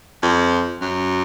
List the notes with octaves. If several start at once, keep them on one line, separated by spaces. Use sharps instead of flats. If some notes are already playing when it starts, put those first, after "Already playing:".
F2
F#2